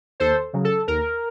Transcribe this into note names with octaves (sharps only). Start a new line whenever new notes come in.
D#2 A4 C5
C#3 F#3
A4
D#2 A#4